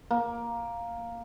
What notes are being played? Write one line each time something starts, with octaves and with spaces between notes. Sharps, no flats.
A#3